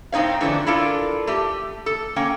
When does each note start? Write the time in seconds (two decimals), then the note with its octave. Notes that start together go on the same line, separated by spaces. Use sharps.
0.12 A2 C4 D#4 C#5 F5
0.41 D3 E3 F3 A3 C#4 D4
0.66 D4 E4 F4 A4 A#4
1.27 A3 G4
1.86 A4
2.16 A#3 C#4 G5